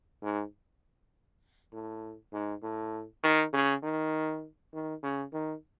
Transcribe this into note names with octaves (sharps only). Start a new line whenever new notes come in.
G#2
A2
G#2
A2
D#3
C#3
D#3
D#3
C#3
D#3